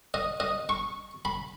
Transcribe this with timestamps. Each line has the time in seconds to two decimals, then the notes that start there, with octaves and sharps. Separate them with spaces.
0.14 D#5
0.40 D#5
0.69 C#6
1.25 B5